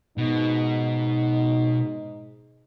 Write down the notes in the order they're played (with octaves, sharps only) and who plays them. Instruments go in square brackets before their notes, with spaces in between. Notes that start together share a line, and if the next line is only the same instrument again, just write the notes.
[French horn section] G#2 D#4 [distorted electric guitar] B2